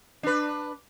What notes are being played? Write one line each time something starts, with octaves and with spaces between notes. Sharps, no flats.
D4 B4